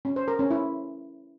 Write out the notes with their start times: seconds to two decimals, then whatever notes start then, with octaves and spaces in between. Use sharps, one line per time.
0.05 C#4
0.16 C5
0.28 A#4
0.39 C#4
0.51 E4